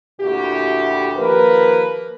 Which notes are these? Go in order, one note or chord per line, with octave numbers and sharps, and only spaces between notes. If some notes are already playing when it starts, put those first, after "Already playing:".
D2 A#2 E4 F#4 G4
D#2 F3 A#3 A#4 B4